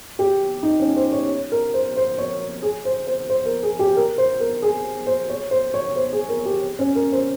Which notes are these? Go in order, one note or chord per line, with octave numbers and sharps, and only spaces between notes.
G4
D#4
C#4
C5
C#5
A#4
C5
C5
C#5
G#4
C5
C5
C5
A#4
G#4
G4
A#4
C5
A#4
G#4
C5
C#5
C5
C#5
C5
G#4
A#4
G4
C#4
A#4
C5